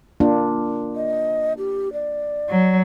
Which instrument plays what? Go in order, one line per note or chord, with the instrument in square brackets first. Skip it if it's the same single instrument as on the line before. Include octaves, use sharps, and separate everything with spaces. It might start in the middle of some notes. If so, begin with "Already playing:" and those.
[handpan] A#3 D4 F4
[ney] D#5
G4
D5
[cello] F#3